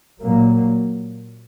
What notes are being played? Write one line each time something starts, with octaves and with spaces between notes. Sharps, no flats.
A#2 F#3 A#3